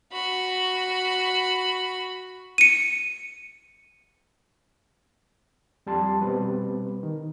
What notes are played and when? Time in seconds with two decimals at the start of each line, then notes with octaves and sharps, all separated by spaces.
0.12 F#4 B5
2.58 C#7 D#7
5.86 F2 G3 A5 C6
6.22 B2 G3 B3 C4 B4
7.03 D#3